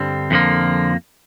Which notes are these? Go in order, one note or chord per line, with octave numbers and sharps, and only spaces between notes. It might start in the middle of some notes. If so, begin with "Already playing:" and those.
Already playing: G2 D3 G3 C4
F2 D3 F3 A#3